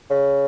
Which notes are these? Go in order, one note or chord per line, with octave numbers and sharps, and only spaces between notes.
C#3